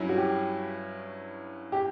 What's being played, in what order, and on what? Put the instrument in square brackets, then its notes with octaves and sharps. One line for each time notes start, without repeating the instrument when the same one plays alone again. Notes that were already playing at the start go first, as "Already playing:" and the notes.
Already playing: [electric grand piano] G2 F#3 C#4 E4
[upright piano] F#4
G4
G4